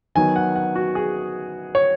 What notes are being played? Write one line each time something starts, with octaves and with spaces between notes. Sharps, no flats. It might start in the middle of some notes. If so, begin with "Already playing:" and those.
D#3 F#3 B3 G#5
F#5
F#5
F#4
G#4
C#5